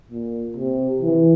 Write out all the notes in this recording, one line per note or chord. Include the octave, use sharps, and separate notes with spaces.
A#2
C3
E3